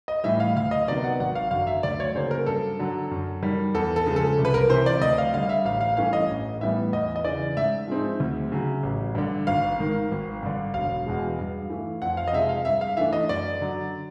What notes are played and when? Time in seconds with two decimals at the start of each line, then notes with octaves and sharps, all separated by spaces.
0.08 D#5
0.24 A2 E3 G3 E5
0.40 F5
0.56 D2 F5
0.71 D#5
0.88 C3 D#3 F#3 B3 D5
1.04 F#5
1.20 G#1 F#5
1.35 F5
1.51 F#2 D3 F#3 F5
1.67 E5
1.83 D2 D5
2.00 C#5
2.15 C#3 F#3 A#3 C5
2.31 A#4
2.46 G2 A4
2.79 D3 F#3
3.11 F#2
3.43 D#3 G3
3.74 E2 A4
3.96 A4
4.06 C#3 F3 G#3
4.16 A4
4.38 C2
4.45 B4
4.54 A#4
4.69 C3 E3 C5
4.86 D5
5.01 D2 D#5
5.18 F5
5.33 D3 G3 F5
5.49 E5
5.65 A1 F5
5.81 F5
5.97 G2 E3 A3 C#4 F5
6.13 D#5
6.30 A1
6.61 A2 E3 G3 B3 E5
6.92 E2 D#5
7.16 D#5
7.24 C#3 E3 D5
7.57 G#2 E5
7.88 F3 G#3 C4 D#4
8.20 D2
8.52 C#3 F#3
8.83 A1
9.15 G2 D3
9.47 G#1 F5
9.79 G#2 D#3
10.11 G#1
10.43 G2 D3
10.74 E1 F5
11.06 E2 B2 G#3
11.39 G2
11.70 E3 A3
12.02 F2 F#5
12.17 F5
12.28 D#5
12.33 C3 F3 G#3 E5
12.49 F5
12.65 G2 E5
12.81 F5
12.97 E3 A3 D4 E5
13.13 D#5
13.29 F#2 D5
13.61 D3 F#3